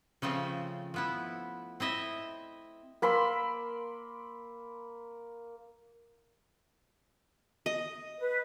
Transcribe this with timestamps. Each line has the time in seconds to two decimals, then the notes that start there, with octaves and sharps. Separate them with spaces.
0.22 C#3 F3 A3 C4
0.94 F3 B3 E4
1.80 C4 E4 D#5 E5
3.02 A#3 B5 C6 E6
7.66 D#5
8.20 B4